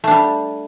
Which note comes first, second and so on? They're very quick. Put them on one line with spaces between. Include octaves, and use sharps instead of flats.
A3 D4 G3